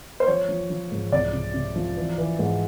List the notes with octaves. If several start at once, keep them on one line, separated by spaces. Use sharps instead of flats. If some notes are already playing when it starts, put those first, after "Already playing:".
C5
F3 C#5
F3
F3
G#2
C2 D5
C3
C3
F3
E3
E3
G#2